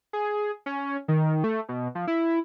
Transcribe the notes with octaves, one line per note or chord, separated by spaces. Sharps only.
G#4
C#4
D#3
A3
B2
F3
E4